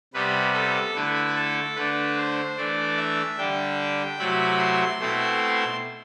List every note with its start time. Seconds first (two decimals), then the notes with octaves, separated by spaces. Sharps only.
0.14 C3 G3 B3 B4
0.54 A4
0.95 D3 A3 E4 B4
1.36 A4
1.76 D3 A3 D4 B4
2.17 C5
2.57 E3 A3 D4 D5
2.97 E5
3.38 D3 G3 D4 G5
4.19 C3 F#3 A3 E4 B5
4.59 C6
5.00 B2 A3 C4 E4